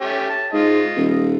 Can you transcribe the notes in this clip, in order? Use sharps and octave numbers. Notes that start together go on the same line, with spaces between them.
A3 C#4 G4
A5
G#2 F4 D#5
D#1